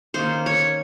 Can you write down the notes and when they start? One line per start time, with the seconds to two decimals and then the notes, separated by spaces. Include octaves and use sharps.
0.14 D#3 A#3 C#4 C5
0.46 C#5